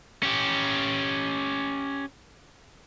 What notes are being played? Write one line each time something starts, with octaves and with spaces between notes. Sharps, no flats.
C#4 G4